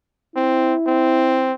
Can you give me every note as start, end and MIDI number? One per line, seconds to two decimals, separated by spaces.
0.36 0.74 60
0.36 1.54 64
0.87 1.53 60